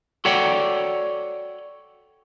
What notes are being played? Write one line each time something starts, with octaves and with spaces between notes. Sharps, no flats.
F#4 A4 C#5 D5 F#5 G5